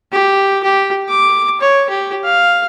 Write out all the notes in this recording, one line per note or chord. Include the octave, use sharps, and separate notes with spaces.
G4
G4
D6
C#5
G4
F5